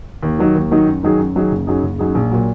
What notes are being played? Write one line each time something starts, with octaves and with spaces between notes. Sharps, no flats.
D#2
D#3 F#3 D#4
D#2
D#3 F#3 D#4
F#2
D#3 F#3 D#4 G#4
F#2
D#3 F#3 D#4 G#4
F#1
F#2 F#3 D#4 G#4
F#1
F#2 F#3 D#4 G#4
A#1
A#2 F#3